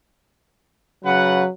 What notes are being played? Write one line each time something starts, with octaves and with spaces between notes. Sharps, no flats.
C#3 F#3 B4 F#5